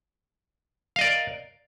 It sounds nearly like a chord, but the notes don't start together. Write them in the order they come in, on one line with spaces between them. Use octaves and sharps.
F5 D#5 D5 A#4